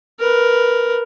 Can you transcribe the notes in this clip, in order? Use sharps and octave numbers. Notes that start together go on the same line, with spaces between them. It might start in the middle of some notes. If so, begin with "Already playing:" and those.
A#4 B4